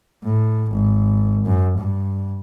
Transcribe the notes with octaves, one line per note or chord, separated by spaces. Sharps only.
A2
G#1
F#2
G2